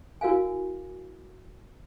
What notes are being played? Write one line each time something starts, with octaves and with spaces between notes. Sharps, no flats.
E4 F#4 A#4 F5 G#5